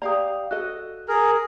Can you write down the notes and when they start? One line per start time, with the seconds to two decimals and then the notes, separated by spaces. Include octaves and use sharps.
0.02 G4 D5 F5 A#5 D#6
0.51 F#4 A4 D#5 F#6
1.08 G#4 A#4 F6